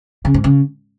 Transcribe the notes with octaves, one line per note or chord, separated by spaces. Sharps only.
C#3
G#2
C#3